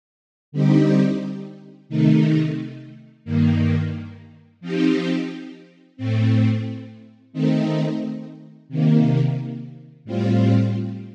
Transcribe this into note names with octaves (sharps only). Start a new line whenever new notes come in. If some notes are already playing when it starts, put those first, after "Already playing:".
D3 G3 C4 D#4 G4
C3 D#3 A3 D#4
G2 D#3 A#3
F3 C4 D#4 G4
A2 A3 C4
D#3 A3 C4 D#4
C3 D#3 A#3
A2 G3 C4 F4